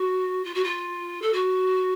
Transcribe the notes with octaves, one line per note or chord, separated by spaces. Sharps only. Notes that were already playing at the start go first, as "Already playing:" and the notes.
Already playing: F#4
F4
F#4
F4
A4
F#4